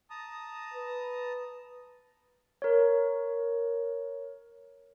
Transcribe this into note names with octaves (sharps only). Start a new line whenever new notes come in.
A5 A#5 D#6
B4
A#4 C#5